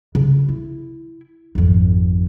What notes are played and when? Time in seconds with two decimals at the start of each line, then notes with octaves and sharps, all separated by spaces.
0.15 C#3
0.49 E4
1.55 G#1 F2